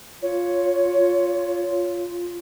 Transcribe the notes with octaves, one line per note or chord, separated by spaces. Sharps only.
F4 C#5